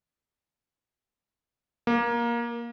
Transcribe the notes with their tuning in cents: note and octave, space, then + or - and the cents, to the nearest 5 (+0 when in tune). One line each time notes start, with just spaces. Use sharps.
A#3 +15